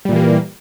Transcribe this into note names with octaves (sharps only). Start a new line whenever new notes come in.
A#2 E3 G3 A#3